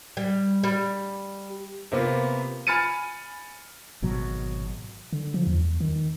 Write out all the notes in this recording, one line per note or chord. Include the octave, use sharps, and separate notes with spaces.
G3
G3
C3 A#3 B3 F4
G#5 B5 F6 A6 C#7 D#7
G#1 B2 F#3
D3
F3
E2
D#3